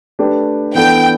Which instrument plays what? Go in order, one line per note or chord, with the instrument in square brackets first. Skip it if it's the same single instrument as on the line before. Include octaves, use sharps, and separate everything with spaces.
[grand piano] A3 D4 G4 B4
[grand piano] E3 B3 D4 A4 D5 [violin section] G5